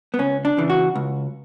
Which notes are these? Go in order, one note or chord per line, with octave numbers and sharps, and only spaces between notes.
B3
C#2 C#4
D4
C#3 E3
F#4
C#2